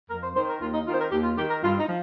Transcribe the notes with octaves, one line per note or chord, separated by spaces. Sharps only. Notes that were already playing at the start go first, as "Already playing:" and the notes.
F2 A#4
C5
D#3 C5
A#4
D#2 F4
D#4
D#3 F4
C5
A#4
D#2 G4
F4
D#3 G4
A#4
G2 F4
D#4
F3